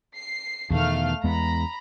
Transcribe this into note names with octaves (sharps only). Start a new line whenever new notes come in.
C7
E2 B2 D#3 A3 F5 F6
E2 G#3 B3 A#5 B5